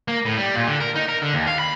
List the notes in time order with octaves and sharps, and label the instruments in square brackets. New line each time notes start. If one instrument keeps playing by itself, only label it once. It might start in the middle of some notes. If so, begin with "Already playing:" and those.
[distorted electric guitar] A#3
A2
G3
A#2
D3
A#4
D#4
A#4
D3
D#2
F5
B5